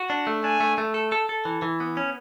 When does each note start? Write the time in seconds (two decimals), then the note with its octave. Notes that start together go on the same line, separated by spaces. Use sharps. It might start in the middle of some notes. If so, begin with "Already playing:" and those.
Already playing: F#4
0.10 D4
0.27 A3
0.44 D4 G#5
0.60 A3
0.78 A3
0.94 A4
1.12 A4
1.29 A4
1.45 E3
1.62 E3
1.80 B3
1.97 C#4